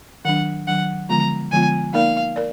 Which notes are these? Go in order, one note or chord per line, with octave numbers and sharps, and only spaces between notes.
D#3 F#3 D4 F#5
D#3 F#3 D4 F#5
D3 F3 G#3 B3 F4 A#5
D3 F3 G#3 B3 F4 G#5
A#3 D#4 A#4 D5 F5
A#4 D5